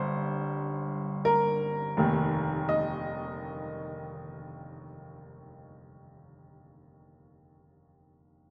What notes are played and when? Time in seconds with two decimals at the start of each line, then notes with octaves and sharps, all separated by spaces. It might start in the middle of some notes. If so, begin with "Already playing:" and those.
Already playing: G1 G2 C5
1.25 A#4
1.97 F1 D#2 D#3
2.69 D#5